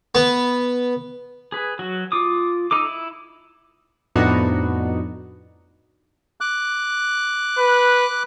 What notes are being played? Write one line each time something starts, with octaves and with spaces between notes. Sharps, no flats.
B3
G#4 B4
F#3 F#4
F4 D6 D#6
D#4 A4 D6
E4
F2 A2 B3 D4 D#4 F#4
D6 F#6
B4